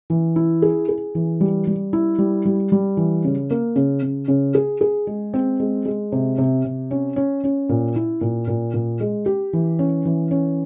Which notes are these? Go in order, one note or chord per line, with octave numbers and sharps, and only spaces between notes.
E3
E4
G#4
G#4
E3
G3
G3
E4
G3
G3
G3
E3
C#3
A#3
C#3
C#3
C#3
G#4
G#4
G#3
C4
G#3
G#3
C3
C3
C3
C#4
C#4
C#4
A#2
E4
A#2
A#2
A#2
G#3
G4
E3
C#4
E3
C#4